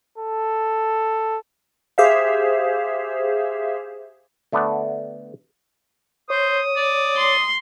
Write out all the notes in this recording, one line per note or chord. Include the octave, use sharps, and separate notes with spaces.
A4
G4 G#4 C5 E5 F5
D3 A3 B3 D4
C5 C#5 D#6
D5
C6